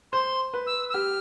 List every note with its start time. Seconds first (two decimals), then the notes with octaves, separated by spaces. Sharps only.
0.12 C5 C6
0.54 B4
0.67 E6
0.89 E6
0.94 G4 F6